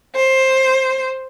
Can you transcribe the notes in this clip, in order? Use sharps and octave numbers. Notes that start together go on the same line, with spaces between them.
C5